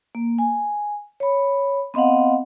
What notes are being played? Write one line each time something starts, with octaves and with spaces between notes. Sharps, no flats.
A#3
G#5
C#5 B5
B3 C4 D#5 F5 F#5